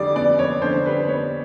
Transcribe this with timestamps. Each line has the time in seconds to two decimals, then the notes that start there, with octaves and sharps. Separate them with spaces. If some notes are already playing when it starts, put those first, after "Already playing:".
Already playing: F2 D3 G3 D5
0.16 B3 D5
0.39 F2 C#5
0.62 D3 C5
0.86 G3 B4
1.08 B3 C#5